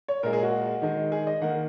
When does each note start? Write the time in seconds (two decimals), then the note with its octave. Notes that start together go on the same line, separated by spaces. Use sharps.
0.08 C#5
0.23 A#2 G#3 A#4
0.33 G#4
0.43 F#4
0.82 D#3 G#3
1.12 G#4
1.27 D#5
1.41 D#3 A#3 F#5